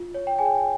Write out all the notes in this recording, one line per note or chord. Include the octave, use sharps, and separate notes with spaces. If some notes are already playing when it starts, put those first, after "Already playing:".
Already playing: F4
C#5
G5
G#4 G#5
G5